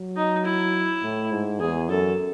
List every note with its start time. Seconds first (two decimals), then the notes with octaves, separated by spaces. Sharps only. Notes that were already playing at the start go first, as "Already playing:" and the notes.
Already playing: F#3
0.16 D#4
0.45 E4
1.03 A2
1.32 G#2
1.60 E2 G#4
1.89 F#2 A4